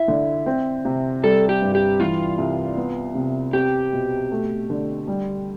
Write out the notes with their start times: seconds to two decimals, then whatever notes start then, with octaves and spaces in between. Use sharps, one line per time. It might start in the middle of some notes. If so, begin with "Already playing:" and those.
Already playing: E4 E5
0.08 D3
0.46 C4
0.85 C3
1.23 G3 A4
1.49 G4
1.62 G2
1.75 G4
2.00 E3 F4
2.38 C2
2.77 B3
3.15 C3
3.53 C4 G4
3.93 B2
4.31 A3
4.70 D3
5.07 G3